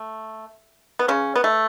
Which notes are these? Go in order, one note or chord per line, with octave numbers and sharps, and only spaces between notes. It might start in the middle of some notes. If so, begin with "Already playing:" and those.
Already playing: A3
B3
C#3 C#4
B3
A3